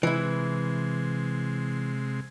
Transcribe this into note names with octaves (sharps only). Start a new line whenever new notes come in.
C3 E3 G#3 E4